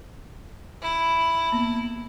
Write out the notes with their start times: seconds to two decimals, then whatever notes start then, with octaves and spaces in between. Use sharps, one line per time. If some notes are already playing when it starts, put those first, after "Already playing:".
0.82 E4
1.52 A#3 B3